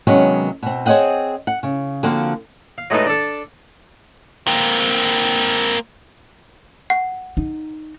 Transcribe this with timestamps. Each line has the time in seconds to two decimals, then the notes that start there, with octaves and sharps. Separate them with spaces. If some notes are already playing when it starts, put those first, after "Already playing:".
0.07 C3 D#3 F#3 G#3 B3 C#4
0.63 B2 C4
0.86 C4 G#4 C#5 D#5 F#5 G5
1.47 F#5
1.63 C#3
2.03 D3 F3 A#3 C4 F#4
2.78 F5
2.90 F#3 G#3 A3 B3 D#4
3.06 D4 A4
4.47 A#3 C4
6.90 F#5
7.37 D#4